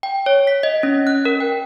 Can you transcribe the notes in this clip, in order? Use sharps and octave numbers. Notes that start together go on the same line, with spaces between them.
G5
C#5
B6
D#5
C#4
F#6
A#4
G5